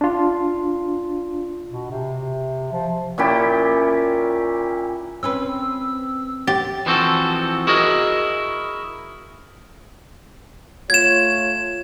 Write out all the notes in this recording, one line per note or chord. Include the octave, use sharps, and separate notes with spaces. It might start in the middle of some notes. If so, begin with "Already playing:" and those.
D4 F4
B2
C3
F3
A#2 C#4 E4 G4
C4 C#4 B4 E6
G4 A6
E3 F3 C4 F#4 A4
E4 F#4 G#4 A#4 D#5
A3 F4 C#5 G#6 E7